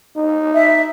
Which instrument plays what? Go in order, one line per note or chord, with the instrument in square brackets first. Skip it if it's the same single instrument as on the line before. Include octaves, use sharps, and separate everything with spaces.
[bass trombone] D#4
[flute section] E5